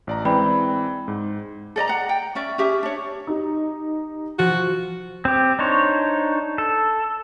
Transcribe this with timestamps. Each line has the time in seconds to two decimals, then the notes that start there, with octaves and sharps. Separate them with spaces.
0.07 A1 D5 A#5
0.25 E3 G#3 C4 D5 G5 B5
1.08 G#2
1.76 A4 D5 D#5 A#5
1.88 F#5 A#5
2.09 G5
2.35 C#4 D5 E5
2.58 C#4 G4 E5
2.83 D4 C#5
3.27 D#4 G4
4.39 F3 F#4
5.25 C4 G4
5.59 D4 D#4 C5 C#5
6.58 A4